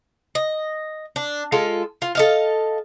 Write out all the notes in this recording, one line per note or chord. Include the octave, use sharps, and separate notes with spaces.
D#5
D4
G#3 F4 A4
F4
A4 D#5 F5